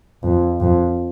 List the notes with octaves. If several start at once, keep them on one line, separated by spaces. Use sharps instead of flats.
F2
F2